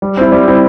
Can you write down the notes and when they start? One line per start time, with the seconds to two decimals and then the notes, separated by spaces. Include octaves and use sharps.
0.02 G3
0.17 C4 E4
0.32 G3
0.48 C4 E4